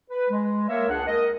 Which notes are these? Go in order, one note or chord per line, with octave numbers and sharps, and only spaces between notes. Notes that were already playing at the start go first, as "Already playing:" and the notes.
B4
G#3
A#3 A#4 C#5 E5
C#2 D4 G#4 F#5
A#4 D#5